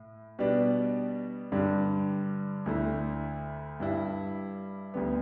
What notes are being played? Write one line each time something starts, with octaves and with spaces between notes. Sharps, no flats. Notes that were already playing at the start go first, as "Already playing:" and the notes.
Already playing: A2
B2 G3 B3 D4
G2 D3 G3
D2 D3 A3 E4
G2 G3 E4
D2 D3 G3 B3